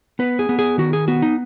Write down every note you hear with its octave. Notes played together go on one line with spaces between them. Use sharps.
B3 B4
G#4
B3
G#4
D#3 F#4
G#4
B3 F#4
D#4